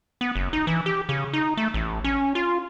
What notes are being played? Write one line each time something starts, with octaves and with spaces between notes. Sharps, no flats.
B3
F#1
D#4
E3
G4
C#3
D#4
A3
A1
C#4
F4